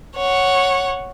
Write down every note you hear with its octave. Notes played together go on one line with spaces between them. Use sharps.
C#5 F#5